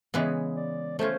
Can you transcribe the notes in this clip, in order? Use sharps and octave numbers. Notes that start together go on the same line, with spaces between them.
C#3 E3 G#3 B3
D5
A3 C#4 F4 C5